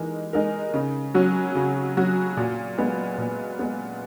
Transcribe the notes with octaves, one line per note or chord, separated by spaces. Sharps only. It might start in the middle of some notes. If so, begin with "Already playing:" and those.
Already playing: E3 G#3 D#4 A#4
G#3 D#4 A#4
C#3
F#3 C#4 F#4
C#3
F#3 C#4 F#4
A#2
G#3 B3
A#2
G#3 B3